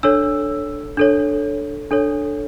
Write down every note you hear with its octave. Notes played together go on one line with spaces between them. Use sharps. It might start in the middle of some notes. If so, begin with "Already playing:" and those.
D4 A4 C#5 E6
D4 A4 C#5
D4 A4 C#5